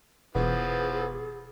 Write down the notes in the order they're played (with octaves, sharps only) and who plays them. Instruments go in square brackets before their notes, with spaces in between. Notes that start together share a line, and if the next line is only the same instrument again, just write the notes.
[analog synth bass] E1 [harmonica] E3 F3 [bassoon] B3 [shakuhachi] G#4